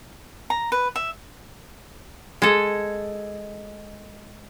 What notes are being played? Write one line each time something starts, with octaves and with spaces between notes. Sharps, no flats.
A#5
B4
E5
G#3 A4